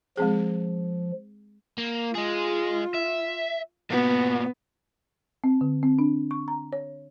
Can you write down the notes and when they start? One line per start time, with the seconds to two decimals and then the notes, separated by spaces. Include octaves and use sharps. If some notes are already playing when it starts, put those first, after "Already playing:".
0.17 F3 G#3 C4 G#4
1.78 A#3
2.15 G#3 F4 G#4
2.95 E5
3.91 A#2 B3 F#4
5.44 C4
5.61 D3
5.83 C4
5.99 D4
6.31 C#6
6.48 A#5
6.73 C#5